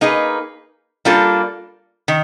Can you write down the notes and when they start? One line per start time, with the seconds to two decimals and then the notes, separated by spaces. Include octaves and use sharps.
0.01 A#3 D#4 G#4 B4
1.05 G3 A#3 D4 F4 A4
2.08 D#3